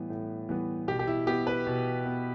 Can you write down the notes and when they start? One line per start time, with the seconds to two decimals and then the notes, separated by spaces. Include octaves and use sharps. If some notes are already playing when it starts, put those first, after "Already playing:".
Already playing: A2 E3 G3 B3
0.10 A2
0.49 E3 G3 B3
0.88 B2 G4
0.99 G4
1.07 E4
1.27 B3 G4
1.47 B4
1.67 B2
2.06 B3